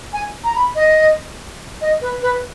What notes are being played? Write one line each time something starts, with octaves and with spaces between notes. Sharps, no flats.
G#5
A#5
B5
D#5
D#5
B4
B4